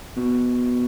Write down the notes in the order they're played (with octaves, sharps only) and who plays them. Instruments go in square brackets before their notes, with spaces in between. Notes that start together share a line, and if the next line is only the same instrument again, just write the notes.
[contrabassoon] B2